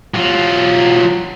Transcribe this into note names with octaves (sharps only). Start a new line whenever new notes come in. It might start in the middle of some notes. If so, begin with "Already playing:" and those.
F#3 F4